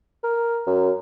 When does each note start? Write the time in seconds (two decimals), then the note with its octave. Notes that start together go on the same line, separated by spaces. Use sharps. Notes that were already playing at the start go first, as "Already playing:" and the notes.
0.24 A#4
0.67 F#2